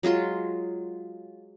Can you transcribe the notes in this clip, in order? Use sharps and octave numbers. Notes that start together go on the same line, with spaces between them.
F#3 G#3 F4 C6